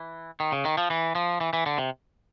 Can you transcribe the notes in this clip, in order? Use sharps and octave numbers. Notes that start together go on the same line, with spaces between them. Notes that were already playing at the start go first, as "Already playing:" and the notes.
Already playing: E3
D#3
C#3
D#3
F3
E3
F3
E3
E3
D3
C3